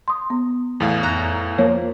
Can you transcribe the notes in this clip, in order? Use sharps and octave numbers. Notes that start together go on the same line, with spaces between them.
C6 D#6
B3
E2 A2 F5
F2 A#5 F#6
F3 A#3 C#5